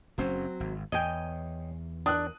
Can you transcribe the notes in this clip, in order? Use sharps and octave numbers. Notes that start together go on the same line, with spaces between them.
F#1 F#3 C4 C#4
G#1
E2 C#5 D#5 G5 G#5
D4 A#4 D#6 F#6